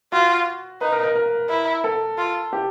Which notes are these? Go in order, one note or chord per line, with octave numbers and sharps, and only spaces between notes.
F4 F#4
D#4 B4
A#4
A#4
A#4
E4
A4
F4
G4